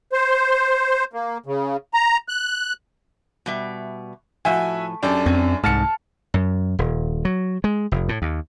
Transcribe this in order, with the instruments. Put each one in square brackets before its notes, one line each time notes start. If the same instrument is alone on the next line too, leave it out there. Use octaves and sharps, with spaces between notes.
[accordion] C5
A#3
C#3
A#5
F#6
[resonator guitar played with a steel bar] B2 G3 E5
[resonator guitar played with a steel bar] A2 F3 [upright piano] F#4 E5 G#5
[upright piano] F#2 D4 [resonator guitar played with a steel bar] G4 A4
[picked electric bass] F2 C4 [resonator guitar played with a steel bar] C#4
[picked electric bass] C2 G#2 [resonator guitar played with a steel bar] A5 [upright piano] F6 A6 C#7
[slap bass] F#2
D#1
F#3
G#3
F1
A2
D#2